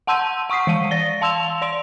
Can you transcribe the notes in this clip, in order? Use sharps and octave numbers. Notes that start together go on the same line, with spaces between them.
F#5 A5 C6 E6 G6 D#7
F#5 C#6 D#6 B6 C7
E3 F5 D#7
D5 A6 A#6 G7
F5 A5 C6 E6 E7 F7
D5 C6 D7 F7